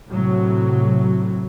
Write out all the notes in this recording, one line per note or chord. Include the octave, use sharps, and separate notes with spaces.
A2 C3 F#3